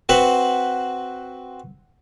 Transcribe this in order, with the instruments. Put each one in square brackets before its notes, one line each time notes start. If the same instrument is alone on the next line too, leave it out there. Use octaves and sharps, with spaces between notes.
[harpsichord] C4 F#4 B4 C5 F#5